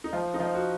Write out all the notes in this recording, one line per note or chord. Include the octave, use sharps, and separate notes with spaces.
D#4
F3 F4
D#4
F3 F4
F#4